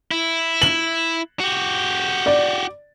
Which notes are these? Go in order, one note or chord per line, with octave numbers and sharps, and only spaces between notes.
E4
F#7
F#4 G4
D5